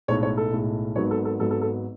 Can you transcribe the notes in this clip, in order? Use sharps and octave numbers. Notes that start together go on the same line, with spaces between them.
B1 A2 G#3 C#5
C#5
A4
B1 A2 G#3
G#1 G#2 F#3 B3 C#5
A4
A4
G#1 G#2 F#3 B3 A4
A4
A4